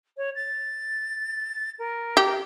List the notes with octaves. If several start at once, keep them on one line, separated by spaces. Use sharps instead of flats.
C#5
A6
A#4
G4